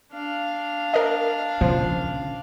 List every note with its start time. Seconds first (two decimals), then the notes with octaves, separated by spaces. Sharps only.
0.12 D4 F5
0.94 A#4 D#5
1.61 C#3 F3